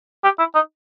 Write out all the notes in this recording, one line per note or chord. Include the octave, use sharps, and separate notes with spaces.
G4
E4
D#4